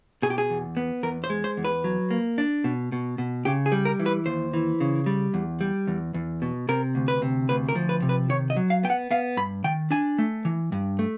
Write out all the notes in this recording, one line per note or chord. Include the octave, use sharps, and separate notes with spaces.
B2 G#4
G4
G#4
E2
B3
E2 A#4
C5
G#3
C5
E2
B4
F#3
A#3
D4
B2
B2
B2
C#3 G4
G#4
G3
A#4
E3
B4
D#2 C5
E3
C#3
G3
E2
G3
E2
E2
B2
C3 A#4
D2
B4
C3
D2 B4
A#4
F3
B4
C3
B4
D#3 C#5
D#5
F#3
F5
B3 G5
F#5
B3 F5
G2 B5
D#3 G5
D4 G#5
A3
E3
G2
A3